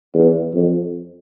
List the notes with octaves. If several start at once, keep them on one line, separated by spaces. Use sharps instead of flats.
E2
F2